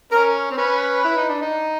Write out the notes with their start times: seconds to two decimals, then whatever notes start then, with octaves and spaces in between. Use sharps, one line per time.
0.12 C#4 A#4
0.51 C4
0.58 C#4 B4
1.04 E4
1.16 D#4
1.29 D4
1.42 D#4